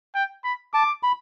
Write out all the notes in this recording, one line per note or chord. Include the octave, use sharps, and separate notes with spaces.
G5
B5
A5 D6
B5